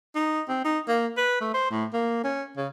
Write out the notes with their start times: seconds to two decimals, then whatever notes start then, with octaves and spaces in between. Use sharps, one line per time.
0.15 D#4
0.48 C4
0.65 D#4
0.88 A#3
1.17 B4
1.41 A3
1.54 C5
1.71 A2
1.93 A#3
2.24 C#4
2.57 C#3